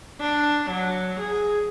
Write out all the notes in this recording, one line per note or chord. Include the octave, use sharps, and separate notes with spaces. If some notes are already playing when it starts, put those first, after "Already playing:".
D4
F#3
G#4